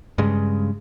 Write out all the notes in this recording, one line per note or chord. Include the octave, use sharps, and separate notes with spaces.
G2 C#3 G#3